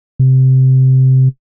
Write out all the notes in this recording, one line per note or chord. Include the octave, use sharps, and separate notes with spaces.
C3